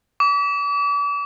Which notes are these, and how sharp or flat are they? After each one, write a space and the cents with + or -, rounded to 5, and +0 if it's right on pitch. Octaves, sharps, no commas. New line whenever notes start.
D6 -40